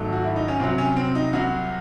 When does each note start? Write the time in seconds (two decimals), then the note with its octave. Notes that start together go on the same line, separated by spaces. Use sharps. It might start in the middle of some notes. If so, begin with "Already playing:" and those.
Already playing: G#1 G#2 F#3 A3
0.13 F#4
0.24 E4
0.36 D#4
0.48 C#4
0.60 C2 C3 F#3 C4
0.78 C#4
0.97 C4
1.15 D#4
1.33 C2 C3 F#3 F#4